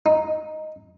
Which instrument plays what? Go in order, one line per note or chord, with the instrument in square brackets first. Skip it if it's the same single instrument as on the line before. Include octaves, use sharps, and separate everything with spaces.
[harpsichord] D#4